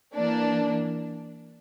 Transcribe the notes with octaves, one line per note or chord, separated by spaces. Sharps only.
E3 A#3 D4